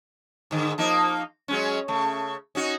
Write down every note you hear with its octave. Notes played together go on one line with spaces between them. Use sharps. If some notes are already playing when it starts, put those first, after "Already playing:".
G#2 D3
F3 A#3 D#4
F#3 G#3 C#4
C#3 A3
C#4 D#4 F#4